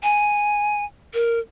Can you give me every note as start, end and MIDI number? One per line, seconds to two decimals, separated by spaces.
0.03 0.85 80
1.14 1.39 70